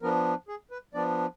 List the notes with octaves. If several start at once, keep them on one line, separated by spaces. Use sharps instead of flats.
F3 B3 D4 A#4
G#4
B4
F3 B3 D4 D5